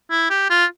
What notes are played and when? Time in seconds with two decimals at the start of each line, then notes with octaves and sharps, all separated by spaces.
0.10 E4
0.30 G4
0.50 F4